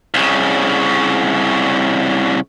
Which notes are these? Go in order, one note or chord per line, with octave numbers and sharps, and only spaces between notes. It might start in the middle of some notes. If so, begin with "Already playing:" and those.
C2 C#3